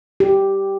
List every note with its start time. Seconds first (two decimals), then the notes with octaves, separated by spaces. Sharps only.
0.20 G4